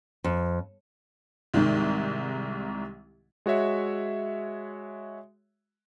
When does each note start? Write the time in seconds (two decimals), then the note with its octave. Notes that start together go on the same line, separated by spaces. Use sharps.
0.24 F2
1.54 C2 G#2 D#3
3.46 G#3 F#4 C#5 E5